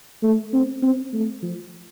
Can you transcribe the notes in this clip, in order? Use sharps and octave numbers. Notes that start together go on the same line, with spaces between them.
A3
C4
C4
A3
F3